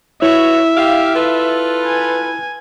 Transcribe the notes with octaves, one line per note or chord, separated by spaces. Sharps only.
E4 F#4 B4 C#5 E5
G4 F5
F4 A4 B4
G#5